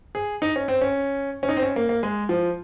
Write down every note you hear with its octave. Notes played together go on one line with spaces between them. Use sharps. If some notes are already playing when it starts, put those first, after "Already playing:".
G#4
D#4
C#4
C4
C#4
C#4
D#4
C4
C#4
A#3
A#3
G#3
F3